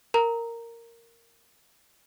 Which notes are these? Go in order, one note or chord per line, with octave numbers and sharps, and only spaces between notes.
A#4 A#5